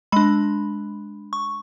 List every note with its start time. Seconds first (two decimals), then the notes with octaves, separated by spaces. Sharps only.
0.12 G#3 D4 B5
1.33 C#6